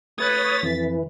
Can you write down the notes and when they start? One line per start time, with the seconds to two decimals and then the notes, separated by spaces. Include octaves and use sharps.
0.18 A3 B4 C#5 D#6 F#6 A6 B6
0.63 F2 E3